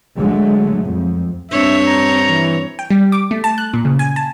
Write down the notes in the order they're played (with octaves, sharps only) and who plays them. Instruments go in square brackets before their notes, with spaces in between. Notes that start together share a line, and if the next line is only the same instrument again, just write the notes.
[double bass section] D3 F#3 G#3 A3
F2
[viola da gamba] G2 C4 C#5 [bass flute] D4 [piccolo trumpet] E5
[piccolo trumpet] A#5
[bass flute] E3
[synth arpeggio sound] G5
G3
D6
A3
A5
F#6
A#2
C#3
G#5
A5